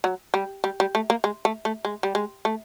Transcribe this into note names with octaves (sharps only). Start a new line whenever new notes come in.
F#3
G3
G3
G3
A3
A#3
G#3
A3
A3
G#3
G3
G#3
A3